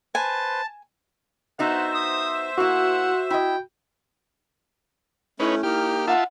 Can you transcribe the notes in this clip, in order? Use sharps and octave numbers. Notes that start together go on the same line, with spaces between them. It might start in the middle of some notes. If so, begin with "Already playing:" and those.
B4 C5 G#5 A5
B3 D#4 F#4 C5 E5 F#5
D#6
A#3 E4 F#4 F#5
E4 D#5 G5
A3 C#4 D#4 E4 B4 C#5
A#3 D#4 G4 F6
F4 E5 F#5 A5